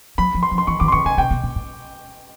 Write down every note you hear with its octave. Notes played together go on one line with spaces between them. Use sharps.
F#3 B5
F3
C6
F3
C6
E3 C#6
D#3 D6
C6
D3 C#6
C#3 G#5
C3 G5
B2
A#2
A2